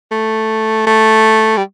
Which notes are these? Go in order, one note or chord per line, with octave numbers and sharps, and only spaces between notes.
A3
A3
G3